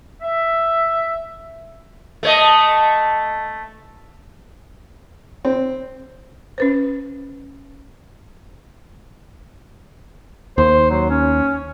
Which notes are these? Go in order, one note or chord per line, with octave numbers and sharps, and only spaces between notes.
E5
A3 C#5 D#5
C4
C#4 B4 C5
D#2 C5
F#3
C#4